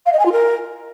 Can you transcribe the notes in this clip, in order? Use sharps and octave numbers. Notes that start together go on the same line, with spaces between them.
F5
D#5
G#5
F4
A#4